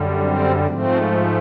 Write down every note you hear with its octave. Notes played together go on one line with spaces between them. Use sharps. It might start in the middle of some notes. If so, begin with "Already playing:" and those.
Already playing: F#2 D3 G3
C4
G#2 F3 A3 C4